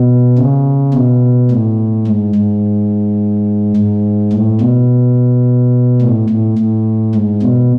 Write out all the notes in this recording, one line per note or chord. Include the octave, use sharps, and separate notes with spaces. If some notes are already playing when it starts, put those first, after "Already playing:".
Already playing: B2
C#3
B2
A2
G#2
G#2
G#2
A2
B2
A2
A2
A2
G#2
B2